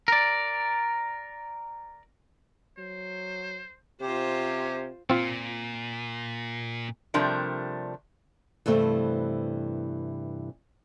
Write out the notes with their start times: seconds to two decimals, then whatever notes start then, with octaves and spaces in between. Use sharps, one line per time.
0.08 A#4 D5
2.79 F#3 C5
4.01 C3 C#4 F4 G4 C5
5.10 A#2 C4 F4
7.14 C3 F3 G3 A3 D4 A#4
8.66 G2 C3 E3 A3 C4